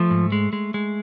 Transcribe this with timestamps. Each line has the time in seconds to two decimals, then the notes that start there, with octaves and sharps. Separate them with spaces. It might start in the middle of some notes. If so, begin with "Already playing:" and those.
Already playing: F3 A3
0.10 G#2
0.32 G#3
0.53 G#3
0.74 G#3